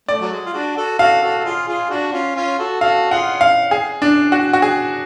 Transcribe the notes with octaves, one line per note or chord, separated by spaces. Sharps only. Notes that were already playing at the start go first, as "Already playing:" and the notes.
A3 D5
F#3
G#3
F4
D4 F#4
F#4 A4
F#4 A4 F5
F#4 A4
A4
F4 G#4
F4 G#4
D4 F#4
C#4 F4
C#4 F4
F#4 A4
F#4 A4 F5
F4 G#4 F#5
F5
G#4
D4
F#4
F#4
G#4